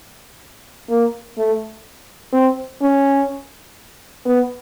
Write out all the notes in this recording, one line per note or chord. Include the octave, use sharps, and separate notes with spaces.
A#3
A3
C4
C#4
B3